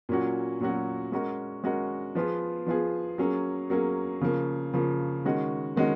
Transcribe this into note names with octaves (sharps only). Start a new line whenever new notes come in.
A#2 F#3 C#4 F#4
A#2 F#3 C#4 F#4
G#3 C#4 F#4 A#4
G#3 C#4 F#4 A#4
F3 B3 F4 G#4
F3 B3 F4 G#4
F#3 A#3 C#4 G#4
F#3 A#3 C#4 G#4
C#3 F3 A#3
C#3 F3 A#3
D#3 G#3 C#4 F#4
D#3 G#3 C#4 F#4